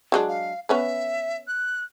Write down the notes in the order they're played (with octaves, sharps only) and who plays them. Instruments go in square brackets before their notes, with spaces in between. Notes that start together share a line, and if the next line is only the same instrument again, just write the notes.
[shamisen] F#3 G#3 D4
[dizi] F5
[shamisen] B3 C#4 B4 [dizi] E5
[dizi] F#6